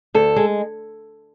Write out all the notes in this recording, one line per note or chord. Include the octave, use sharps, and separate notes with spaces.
D2 A4
G#3